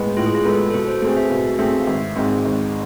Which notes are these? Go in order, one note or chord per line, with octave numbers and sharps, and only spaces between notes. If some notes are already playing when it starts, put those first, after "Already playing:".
Already playing: A2 G#3 B3
A2 F4
G#4
F4
G#3 B3 A4
A4
B2 B4
C5
A3 C4 G#4 C5
E5
B2 F5
A3 C4 G#4 E5
F5
G#1 E5
G#2 G#3 C4
G#1